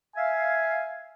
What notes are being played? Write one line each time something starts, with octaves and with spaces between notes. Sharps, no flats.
E5 F5 G#5